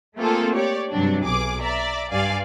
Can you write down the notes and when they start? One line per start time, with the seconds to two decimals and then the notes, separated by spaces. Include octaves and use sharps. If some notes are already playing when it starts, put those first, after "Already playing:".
0.16 A3 A#3 C4 F4 G#4 A4
0.53 G4 C#5 D5
0.90 G2 C3 F#3 D4
1.24 B1 G#4 D6
1.61 D5 E5 A#5
2.09 G2 D5 F5 G#5